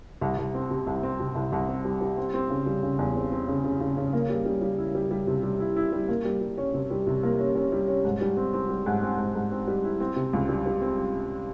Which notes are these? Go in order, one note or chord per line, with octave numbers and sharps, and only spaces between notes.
C2
C2
C4
C3
C2
C4
C3
C2
C2
C4
G3
G3
C4
C4
C#3
G3
C#3
E2
C4
C4
C#3
C#3
C#3
C#3
A#3
G3
G3
G3
E4
G3
G3
C3
G3
E4
E4
G3
A#3
G3
G3
C#4
C3
G3
C3
A#3
C#4
C#4
G3
C#4
G#2
G3
C4
C4
G3
G#2
C4
G#2
G#2
C4
G3
E4
C4
C3
C#2
G3
G3
C4